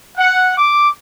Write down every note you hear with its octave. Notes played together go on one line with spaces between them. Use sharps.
F#5
D6